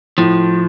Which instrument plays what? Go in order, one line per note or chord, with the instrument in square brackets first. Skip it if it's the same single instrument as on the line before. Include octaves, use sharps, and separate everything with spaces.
[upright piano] A2 [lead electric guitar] F3